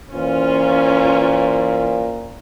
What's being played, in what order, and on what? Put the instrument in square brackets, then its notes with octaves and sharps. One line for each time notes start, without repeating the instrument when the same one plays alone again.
[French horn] A#2 [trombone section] E3 B4 C5 [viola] C#4 F4